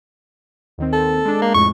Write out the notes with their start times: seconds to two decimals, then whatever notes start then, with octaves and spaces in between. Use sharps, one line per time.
0.78 D#2 D#3 C4
0.93 A4
1.25 G#3 D4
1.42 A#3
1.54 F2 A2 G#3 C#6